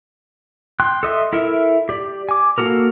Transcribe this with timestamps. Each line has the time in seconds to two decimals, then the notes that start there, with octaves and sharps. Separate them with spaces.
0.80 G5 C6 F#6
1.03 A4 D#5 E5 C6
1.33 E4 A4 A#4 E5
1.89 G4 D5
2.29 G#5 D6
2.58 A#3 D#4 F#4 A4 A#4